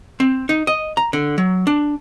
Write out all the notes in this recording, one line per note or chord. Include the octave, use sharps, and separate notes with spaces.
C4
D#4
D#5
A#5
D3
F#3
D4